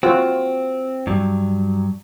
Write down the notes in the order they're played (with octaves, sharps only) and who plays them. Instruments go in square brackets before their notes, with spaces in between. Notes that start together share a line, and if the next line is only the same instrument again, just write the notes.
[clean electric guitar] C4 [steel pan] F4 F#4
[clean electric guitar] G2 F#3